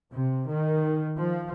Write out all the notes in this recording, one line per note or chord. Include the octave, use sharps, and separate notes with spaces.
C3
D#3
F3